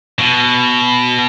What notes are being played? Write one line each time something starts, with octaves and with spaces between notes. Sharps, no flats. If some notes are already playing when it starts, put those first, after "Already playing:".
B2